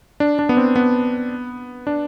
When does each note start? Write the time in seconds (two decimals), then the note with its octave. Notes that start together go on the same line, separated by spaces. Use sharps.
0.20 D4
0.39 D4
0.49 B3
0.57 C4
0.76 B3
1.87 D4